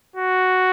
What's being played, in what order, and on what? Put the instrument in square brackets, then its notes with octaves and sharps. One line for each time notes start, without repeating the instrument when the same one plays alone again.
[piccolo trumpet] F#4